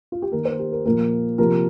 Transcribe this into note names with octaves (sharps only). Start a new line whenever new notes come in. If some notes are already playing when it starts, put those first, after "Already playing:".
F4
G4
D#3 A#3 A#4
C5
G4
A#4
A#2 F3 A#3 A#4
C3 F3 A#3 A#4